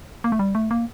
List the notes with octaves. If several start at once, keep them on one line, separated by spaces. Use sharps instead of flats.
A#3
A3
G3
A3
A#3